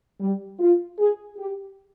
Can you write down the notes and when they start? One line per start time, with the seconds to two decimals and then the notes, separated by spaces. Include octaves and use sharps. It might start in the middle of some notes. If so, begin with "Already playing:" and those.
0.20 G3
0.59 F4
0.99 G#4
1.38 G4